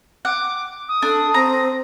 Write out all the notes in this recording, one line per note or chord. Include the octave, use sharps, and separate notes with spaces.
F#5 D6
D#6
D4 A4
C4 A#5